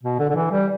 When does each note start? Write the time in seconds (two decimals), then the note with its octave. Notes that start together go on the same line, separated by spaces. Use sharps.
0.03 B2
0.19 D3
0.30 D3
0.35 E3
0.52 G3